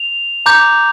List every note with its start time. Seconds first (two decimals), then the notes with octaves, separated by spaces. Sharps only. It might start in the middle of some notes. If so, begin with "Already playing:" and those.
Already playing: F7
0.46 A#5 D6 G6